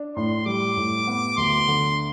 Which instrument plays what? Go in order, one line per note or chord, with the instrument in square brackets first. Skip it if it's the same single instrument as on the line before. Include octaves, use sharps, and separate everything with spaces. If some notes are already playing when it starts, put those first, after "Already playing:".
Already playing: [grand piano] D4
[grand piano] A2 [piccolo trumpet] C6
[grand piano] G3 [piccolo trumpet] D6
[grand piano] A2
B3
[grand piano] D2 [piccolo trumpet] C6
[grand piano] D3